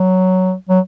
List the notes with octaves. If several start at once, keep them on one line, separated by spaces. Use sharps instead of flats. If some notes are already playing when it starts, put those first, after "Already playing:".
Already playing: F#3
F#3